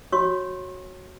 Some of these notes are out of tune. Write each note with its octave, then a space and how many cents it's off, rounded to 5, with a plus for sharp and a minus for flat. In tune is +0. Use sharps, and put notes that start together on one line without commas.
F#4 +0 C#5 -15 C#6 -40